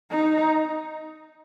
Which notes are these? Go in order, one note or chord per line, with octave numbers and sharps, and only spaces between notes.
D#4